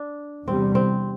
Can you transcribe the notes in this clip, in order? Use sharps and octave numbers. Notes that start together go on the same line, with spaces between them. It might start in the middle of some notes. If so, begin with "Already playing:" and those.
Already playing: D4
E2 C3 G3 C4
C4